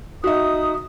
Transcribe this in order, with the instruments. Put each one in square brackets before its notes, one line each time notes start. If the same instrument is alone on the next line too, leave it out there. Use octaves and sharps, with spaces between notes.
[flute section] D#4 D#6 [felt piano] F#4 E5